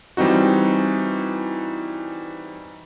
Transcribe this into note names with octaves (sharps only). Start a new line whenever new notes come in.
E3 G3 C4 D#4 F#4